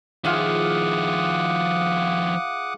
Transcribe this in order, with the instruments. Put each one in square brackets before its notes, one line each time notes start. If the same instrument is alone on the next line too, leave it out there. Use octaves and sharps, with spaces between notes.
[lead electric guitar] D#3 F3 [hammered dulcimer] F4 G#4 E5 [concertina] F#5 D6 D#6